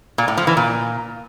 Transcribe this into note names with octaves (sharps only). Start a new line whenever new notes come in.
A#2
A2
F3
E3
A#2